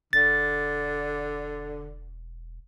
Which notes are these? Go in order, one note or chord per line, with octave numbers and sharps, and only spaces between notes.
E1 D3 A6